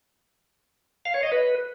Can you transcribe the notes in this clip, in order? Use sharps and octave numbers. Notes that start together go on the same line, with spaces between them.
F5
C#5
D#5
B4